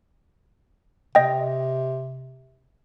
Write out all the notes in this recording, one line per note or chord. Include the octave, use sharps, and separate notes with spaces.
C3 D#5 G5